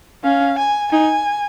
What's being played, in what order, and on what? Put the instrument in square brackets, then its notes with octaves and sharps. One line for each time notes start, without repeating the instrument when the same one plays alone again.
[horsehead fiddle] C#4 [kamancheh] F5
[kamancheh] G#5
[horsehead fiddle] D#4 [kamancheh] G#5